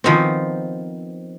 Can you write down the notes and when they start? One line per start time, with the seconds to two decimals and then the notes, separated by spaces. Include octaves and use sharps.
0.04 D#3 F3 B3 C4 F#4